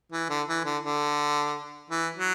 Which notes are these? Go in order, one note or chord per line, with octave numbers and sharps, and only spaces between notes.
E3
D3
E3
D3
D3
E3
F#3